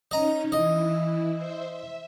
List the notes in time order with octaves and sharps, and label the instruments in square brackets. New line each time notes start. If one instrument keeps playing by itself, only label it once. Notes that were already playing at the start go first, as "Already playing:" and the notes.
[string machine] C#4 D#4 [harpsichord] D#5 A#5
[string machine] E3 E4 [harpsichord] D#5
[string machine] C5 E5
E5